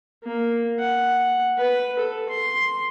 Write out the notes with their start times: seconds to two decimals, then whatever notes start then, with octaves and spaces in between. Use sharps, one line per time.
0.24 A#3
0.79 F#5
1.58 B4
1.99 A4
2.29 C6